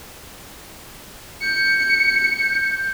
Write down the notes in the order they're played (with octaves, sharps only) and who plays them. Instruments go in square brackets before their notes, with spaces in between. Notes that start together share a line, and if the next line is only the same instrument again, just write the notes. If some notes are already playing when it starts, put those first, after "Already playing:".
[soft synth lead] G6 [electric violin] C#7